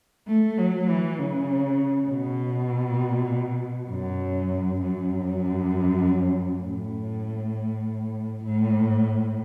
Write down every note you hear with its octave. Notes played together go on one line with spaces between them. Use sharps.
A3
F#3
E3
C#3
B2
F#2
F#2
A2
A2